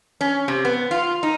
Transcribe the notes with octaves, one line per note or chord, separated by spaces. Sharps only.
C#4
C3
B3
F4
D#4